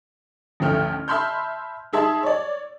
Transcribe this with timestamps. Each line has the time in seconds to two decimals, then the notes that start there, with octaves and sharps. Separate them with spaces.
0.60 A1 D2 F3 A3 G5 F6
1.08 E5 A5 B5 C6 F6 G6
1.93 D#4 G#4 E5 A5 C6
2.23 C#5 D5